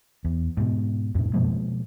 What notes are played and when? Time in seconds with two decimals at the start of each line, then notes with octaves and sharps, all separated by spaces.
0.25 E2
0.57 G#2 B2
1.15 F2 A2
1.33 B2 F3 G#3 A#3